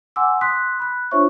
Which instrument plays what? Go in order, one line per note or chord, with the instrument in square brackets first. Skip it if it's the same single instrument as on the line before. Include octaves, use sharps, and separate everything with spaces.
[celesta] F#5 G#5 C6 D6 E6
C6 D#6 F#6 B6
B5 F#6
D4 F4 C5 C#5 E5 C#6